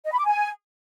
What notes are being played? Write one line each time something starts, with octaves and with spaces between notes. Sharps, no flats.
D#5
B5
D6
G#5